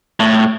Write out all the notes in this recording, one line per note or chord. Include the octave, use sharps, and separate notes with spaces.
A2